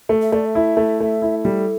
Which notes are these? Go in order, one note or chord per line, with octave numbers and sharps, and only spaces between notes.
A3
E5
A3 D5
E5
E4
A3
A3
E4
G3 A4